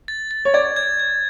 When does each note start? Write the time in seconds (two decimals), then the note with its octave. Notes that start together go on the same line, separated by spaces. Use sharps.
0.08 A6
0.31 A6
0.45 C#5
0.54 D5 G#6
0.76 G#6
1.00 G#6